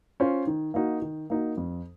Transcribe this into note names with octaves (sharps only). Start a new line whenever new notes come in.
C#4 F4 C5
D#3
A#3 D#4 F#4
D#3
A#3 D#4 F#4
F2